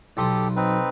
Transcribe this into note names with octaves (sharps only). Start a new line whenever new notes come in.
B1 G4 A4 C6 D#6
C4 D#4 B4